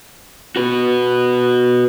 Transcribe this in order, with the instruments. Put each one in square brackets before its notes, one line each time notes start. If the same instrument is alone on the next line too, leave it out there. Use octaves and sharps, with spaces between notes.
[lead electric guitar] F#4 B4